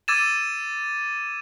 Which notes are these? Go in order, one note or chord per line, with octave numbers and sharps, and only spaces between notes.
D6 E6 G#6 A6 D#7 E7